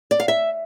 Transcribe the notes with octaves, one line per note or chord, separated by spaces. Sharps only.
D5
F5
E5